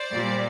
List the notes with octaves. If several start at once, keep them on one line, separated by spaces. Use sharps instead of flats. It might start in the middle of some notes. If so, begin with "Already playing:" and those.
Already playing: C5 D5
A#2 G3